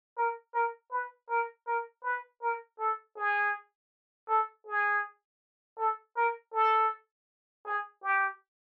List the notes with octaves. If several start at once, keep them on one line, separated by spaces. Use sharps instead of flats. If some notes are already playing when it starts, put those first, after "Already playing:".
A#4
A#4
B4
A#4
A#4
B4
A#4
A4
G#4
A4
G#4
A4
A#4
A4
G#4
G4